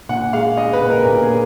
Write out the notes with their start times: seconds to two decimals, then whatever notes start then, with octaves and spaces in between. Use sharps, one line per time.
0.09 A#2 F#5
0.33 G#3 F5
0.57 G#3 D#5
0.73 B4
0.81 A#2
0.90 A#4
1.05 A#2 A#4
1.22 G#4